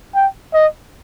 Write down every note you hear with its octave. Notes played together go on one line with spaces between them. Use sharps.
G5
D#5